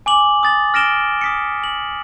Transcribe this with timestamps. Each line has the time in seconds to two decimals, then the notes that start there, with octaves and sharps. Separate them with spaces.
0.06 G#5 D6 F#7
0.43 D#6 A6 F#7
0.74 F6 A#6 D7 E7 G7
1.21 D#6 B6 C#7
1.64 F#7